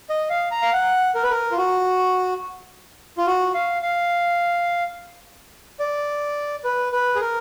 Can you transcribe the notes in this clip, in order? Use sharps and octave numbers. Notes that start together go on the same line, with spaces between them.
D#5
F5
A#5
F5
F#5
A#4
B4
A#4
F4
F#4
F4
F#4
F5
F5
D5
B4
B4
G#4
A#4